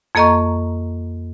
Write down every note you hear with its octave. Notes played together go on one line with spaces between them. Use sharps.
F2 A#3 A4 D#5 A#5 C#6